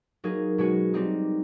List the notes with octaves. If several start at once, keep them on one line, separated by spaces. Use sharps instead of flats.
F#3 A#3 D#4 G#4
B2 G#3 C#4 F#4
G3 C4 D#4